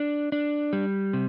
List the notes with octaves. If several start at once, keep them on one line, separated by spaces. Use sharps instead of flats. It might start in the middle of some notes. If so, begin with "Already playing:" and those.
Already playing: D4
D4
G3
C3